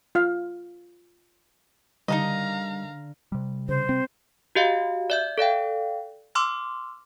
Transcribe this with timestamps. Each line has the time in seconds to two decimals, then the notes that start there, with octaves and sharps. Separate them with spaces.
0.15 F4 F5
2.08 D3 G3 D#4 A#4 D#5 F5 A#5
3.32 C3 G3
3.69 C#3 C5
3.89 C4
4.55 F#4 G4 D#5 F5
5.10 D5 E5 G6
5.38 A4 D5 F5 G5
6.35 C6 D6 E6 F6